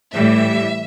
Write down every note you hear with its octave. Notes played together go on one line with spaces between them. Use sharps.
A2 E3 G3 E5